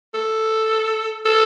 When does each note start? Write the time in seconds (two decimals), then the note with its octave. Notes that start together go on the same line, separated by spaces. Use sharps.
0.14 A4
1.25 A4